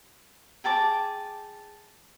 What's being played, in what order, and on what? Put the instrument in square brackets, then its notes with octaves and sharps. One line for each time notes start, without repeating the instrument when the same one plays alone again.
[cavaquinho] G#4 G5 A5 D6